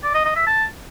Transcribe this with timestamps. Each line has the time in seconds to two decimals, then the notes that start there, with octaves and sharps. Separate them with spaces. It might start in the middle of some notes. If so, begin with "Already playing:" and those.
0.04 D5
0.15 D#5
0.25 D#5
0.36 E5
0.47 A5